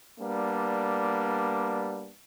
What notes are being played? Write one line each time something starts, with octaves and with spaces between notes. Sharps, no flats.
G3 A#3 B3 D4